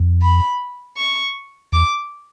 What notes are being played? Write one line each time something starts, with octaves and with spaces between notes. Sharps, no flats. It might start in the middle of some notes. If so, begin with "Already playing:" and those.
Already playing: F2
B5
C#6
E2 D6